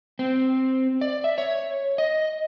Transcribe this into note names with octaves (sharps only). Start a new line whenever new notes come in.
C4
D5
E5
C#5
D#5